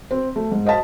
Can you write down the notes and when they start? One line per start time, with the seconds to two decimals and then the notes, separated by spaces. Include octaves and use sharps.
0.11 C4
0.36 A3
0.51 G#2
0.65 C5 D#5 F5 A5 B6